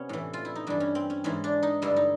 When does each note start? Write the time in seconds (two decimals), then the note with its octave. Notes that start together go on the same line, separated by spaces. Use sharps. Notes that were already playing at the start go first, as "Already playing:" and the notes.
Already playing: C3 B3 C#4
0.09 A2 E3
0.33 F4
0.45 E4
0.55 D#4
0.67 G2 E3 D4
0.80 C#4
0.95 C4
1.10 C#4
1.24 G#2 E3 C#4
1.44 D4
1.63 D#4
1.82 G2 D3 E4
1.96 D#4